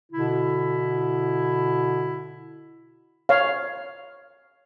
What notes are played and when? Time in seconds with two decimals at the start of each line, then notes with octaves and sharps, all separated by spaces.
0.12 B2 D3 E4
3.29 C#5 F5